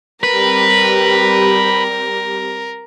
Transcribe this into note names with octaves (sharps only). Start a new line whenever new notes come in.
G3 C4 G4 A#4 B4